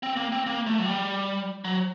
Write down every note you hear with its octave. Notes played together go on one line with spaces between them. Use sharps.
C4
A#3
C4
A#3
A3
F#3
G3
F#3